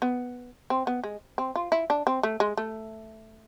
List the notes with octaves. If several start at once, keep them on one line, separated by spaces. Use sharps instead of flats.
B3
C4
B3
G#3
C4
F4
E4
D4
C4
A3
G#3
A3